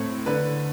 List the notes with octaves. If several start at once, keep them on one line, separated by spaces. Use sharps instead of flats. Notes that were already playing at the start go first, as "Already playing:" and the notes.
Already playing: A2 A3 C4
D3 B4